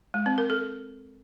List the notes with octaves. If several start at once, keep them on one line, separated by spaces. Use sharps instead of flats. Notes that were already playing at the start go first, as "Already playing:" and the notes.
G#3
C4
A#4
A4